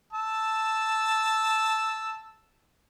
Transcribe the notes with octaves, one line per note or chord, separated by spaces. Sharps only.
A5 E6